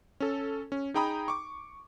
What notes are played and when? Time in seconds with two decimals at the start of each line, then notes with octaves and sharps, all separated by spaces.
0.20 C#4 A4
0.72 C#4
0.94 D#4 G#4 G5 A#5 B5 D#6
1.28 C#6 D6